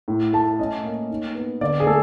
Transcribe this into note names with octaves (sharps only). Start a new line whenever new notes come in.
A2
A3 A5
C#4 D#5
A#3
D#4
B3
D3 D5
G#4
A3 A4